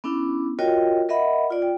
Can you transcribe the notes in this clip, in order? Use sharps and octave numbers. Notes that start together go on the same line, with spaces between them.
B3 C#4 D4 E4
F4 F#4 A#4 C#5 D#5 G5
A#4 D#5 E5 F#5 B5
F4 D5
G5